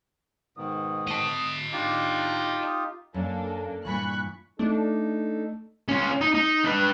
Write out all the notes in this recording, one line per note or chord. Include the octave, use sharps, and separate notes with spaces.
G#2 B2 D#3 D#6
D#5 A5
D4 D#4 F4 G4
D#6
F#2 A#3 D4 A4
G2 A#2 E3 B5 C#6 F#6
A3 D4 D#4 A4
C#4 F4
D#4
D#4
D4 B4